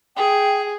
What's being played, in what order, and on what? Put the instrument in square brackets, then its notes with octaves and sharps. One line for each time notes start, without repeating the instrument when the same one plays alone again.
[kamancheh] G#4 [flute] G5